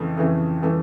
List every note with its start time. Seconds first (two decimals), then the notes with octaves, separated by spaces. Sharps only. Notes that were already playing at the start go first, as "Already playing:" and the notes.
Already playing: F2 C#3 E3 A3
0.17 F2 C#3 E3 A3
0.62 C#3 E3 A3